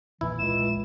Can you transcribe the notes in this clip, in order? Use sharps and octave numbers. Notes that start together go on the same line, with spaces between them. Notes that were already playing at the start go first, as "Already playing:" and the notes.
E1 A#1 A#2 E3 E4
C#2 E7